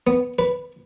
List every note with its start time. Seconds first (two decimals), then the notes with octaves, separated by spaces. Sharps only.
0.07 B3
0.39 B4